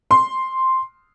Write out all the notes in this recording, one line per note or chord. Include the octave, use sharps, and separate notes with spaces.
C6